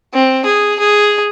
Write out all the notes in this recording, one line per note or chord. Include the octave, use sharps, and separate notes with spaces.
C4
G#4
G#4